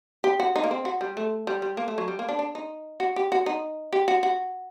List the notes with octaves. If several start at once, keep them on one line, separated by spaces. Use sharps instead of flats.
G4
F#4
D#4
A#3
C4
F#4
G3
A3
G3
G3
A#3
A3
F#3
G3
A#3
D4
D4
D#4
F#4
G4
F#4
D#4
G4
F#4
F#4